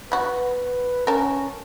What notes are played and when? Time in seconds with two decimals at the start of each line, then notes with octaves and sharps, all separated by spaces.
0.12 B3 F#4 B4
1.07 C#4 A#4 A5